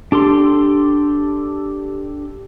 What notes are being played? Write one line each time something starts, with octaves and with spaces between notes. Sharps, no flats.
D4 G4 A4 C6